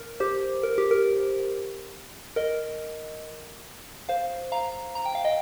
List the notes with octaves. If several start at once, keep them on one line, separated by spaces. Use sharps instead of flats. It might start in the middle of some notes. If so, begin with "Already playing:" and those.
Already playing: A#4
G4 C5
A#4
G4
A#4
A#4 D#5
C5 F5
F5 A#5
A#5
G5
F5
D#5 G5